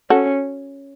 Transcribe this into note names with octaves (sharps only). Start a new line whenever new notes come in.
C#4 F#4 A4